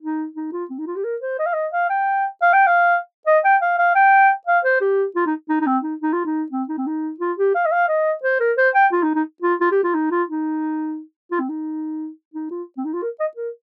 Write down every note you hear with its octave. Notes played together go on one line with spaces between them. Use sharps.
D#4
D#4
F4
C4
D#4
F4
G4
A#4
C5
D#5
F5
D#5
F5
G5
F5
G5
F5
D#5
G5
F5
F5
G5
F5
C5
G4
F4
D#4
D#4
D#4
C4
D#4
D#4
F4
D#4
C4
D#4
C4
D#4
F4
G4
F5
D#5
F5
D#5
C5
A#4
C5
G5
F4
D#4
D#4
F4
F4
G4
F4
D#4
F4
D#4
F4
C4
D#4
D#4
F4
C4
D#4
F4
A#4
D#5
A#4